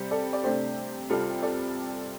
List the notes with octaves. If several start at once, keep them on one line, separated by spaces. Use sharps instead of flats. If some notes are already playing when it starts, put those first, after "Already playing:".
Already playing: C3 G3 C4 G4
A4 D5
D5
C3 A3 D4 G4 C5
C2 C3 G3 C4 F4 A4
A4 D5